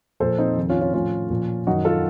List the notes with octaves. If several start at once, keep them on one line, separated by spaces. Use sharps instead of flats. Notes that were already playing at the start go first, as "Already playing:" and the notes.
A#2 F3 A4 C5
C4 D#4
F2 C3 D#3
C#4 F4
C#4 F4
A2 F3 C#4 F4
A#2 F3
F#2 D#3 D#4 F#4
F4 A4